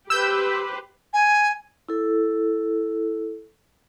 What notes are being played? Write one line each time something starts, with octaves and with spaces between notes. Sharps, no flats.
G4 B4 C5 E6 G6
G#5
E4 A4